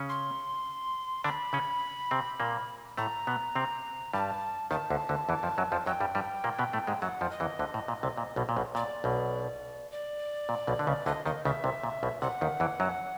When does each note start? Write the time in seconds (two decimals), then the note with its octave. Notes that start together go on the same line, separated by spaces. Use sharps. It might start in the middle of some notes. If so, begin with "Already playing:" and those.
Already playing: C#3 C#4
0.09 C6
1.24 D3 D4 B5
1.53 C#3 C#4
2.11 C3 C4
2.40 A#2 A#3
2.97 A2 A3 A#5
3.27 B2 B3
3.55 C3 C4
4.13 G2 G3 A5
4.71 D#2 D#3 A5
4.90 D2 D3
5.09 D2 D3
5.29 E2 E3
5.43 F2 F3
5.58 F#2 F#3
5.72 F2 F3
5.86 F#2 F#3 G5
6.00 G2 G3
6.15 G2 G3
6.44 A#2 A#3
6.59 B2 B3
6.73 A2 A3
6.87 G#2 G#3
7.02 F#2 F#3 F#5
7.21 F2 F3
7.31 D#5
7.40 E2 E3
7.59 D2 D3
7.74 A2
7.88 A#2
8.03 C2 C3
8.18 A#2
8.36 B1 B2
8.49 A#2
8.57 B1 B2
8.75 A#2 D5
9.04 B1 B2
9.92 D5
10.49 A#2
10.67 B1 B2
10.79 D3
10.87 C#2 C#3
11.06 D2 D3 D#5
11.26 D#2 D#3 D#5
11.45 C#2 C#3 E5
11.64 C2 C3
11.83 A#2
12.03 B1 B2
12.22 C2 C3 F#5
12.41 D#2 D#3
12.60 E2 E3
12.80 F#2 F#3